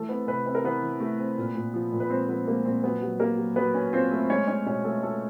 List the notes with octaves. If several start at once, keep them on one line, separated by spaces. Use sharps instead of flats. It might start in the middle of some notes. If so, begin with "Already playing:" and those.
Already playing: E3 A3 A4
B3 C4 B4
C3 B3 B4
C4 B4
A#4
E3 B3 B4
E3
A3
C4
A#2
A#2
F3
A#2
B4
G#3 C4 C5
F3 B3 B4
G#3 A#3 A#4
A#2 C4 C5
F#3 B3 B4
F#3
F#3 A#3 A#4
F#3
F#3 B3 B4
C#4
C4 F4 C5
A3
G#3 C#4 C#5
C#4 C#5
B2 C#4 C#5
A3 F4 A4
A3 F4 A4